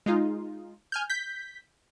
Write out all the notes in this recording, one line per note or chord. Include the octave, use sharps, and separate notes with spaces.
G#3 D#4 F4
G#5 F6 G6
G6 B6